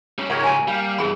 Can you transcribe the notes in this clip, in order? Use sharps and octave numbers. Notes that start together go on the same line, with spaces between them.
G3 C#4
C#2 G#2 G4 A#4 C#5 F#5
G#5 A5
G3 A#3 F5 G5
E2 G2 G#4 B5